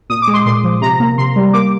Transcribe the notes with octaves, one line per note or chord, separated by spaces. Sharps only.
A#2 D#6
D6
G#3
C6
A#2 C6
F3
C3 A#5
A#3
C3 C6
G3
A#3 D6